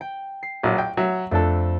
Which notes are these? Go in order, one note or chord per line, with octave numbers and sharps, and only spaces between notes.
G5
C7
A#1 F#3
G5
F#3 E5
F2 A3 D4 A4